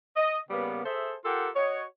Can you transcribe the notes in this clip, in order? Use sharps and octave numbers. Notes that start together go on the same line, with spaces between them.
D#5
C#3 G3 A#3 B3
G#4 A4 C5 E5
F4 G4 A4 A#4 F#5 G5
F#4 C#5 D#5